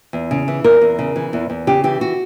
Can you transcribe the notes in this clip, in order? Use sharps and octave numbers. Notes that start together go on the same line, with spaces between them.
E2
C#3
E3
E2 A#4
E2
C#3
E3
E2
E2
C#3 G4
E3 G4
F#4